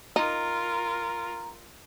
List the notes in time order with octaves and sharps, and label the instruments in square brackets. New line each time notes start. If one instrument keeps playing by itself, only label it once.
[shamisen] D#4 [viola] F4 A#4 [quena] A#5